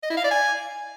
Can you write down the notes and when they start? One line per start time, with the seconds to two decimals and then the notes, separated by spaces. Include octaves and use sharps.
0.03 D#5
0.10 E4
0.17 F5
0.24 D5
0.31 G#5